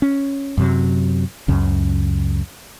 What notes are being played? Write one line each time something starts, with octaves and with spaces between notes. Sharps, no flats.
C#4
F#2 C3 F#3
C#2 F#2 C#3